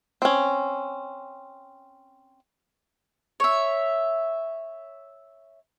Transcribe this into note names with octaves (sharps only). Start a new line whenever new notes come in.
C4 C#4
C#5 E5